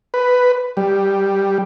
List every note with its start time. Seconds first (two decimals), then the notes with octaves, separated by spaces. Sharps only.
0.14 B4
0.77 G3